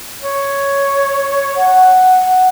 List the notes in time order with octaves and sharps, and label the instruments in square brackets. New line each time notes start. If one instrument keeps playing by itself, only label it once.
[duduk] C#5
[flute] F#5